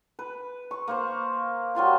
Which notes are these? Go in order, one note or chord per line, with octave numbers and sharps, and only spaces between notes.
B4
C#6
A#3 C5 C#6
F#3 G3 F4 C6